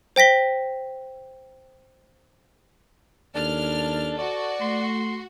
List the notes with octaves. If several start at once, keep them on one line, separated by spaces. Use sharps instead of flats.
C5 G5 A#6 B6 G7
D#2 D4 A4 F6
F#4 D5
A3 C6